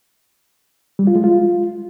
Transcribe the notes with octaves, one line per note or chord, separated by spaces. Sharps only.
G3
F4
G#3
F4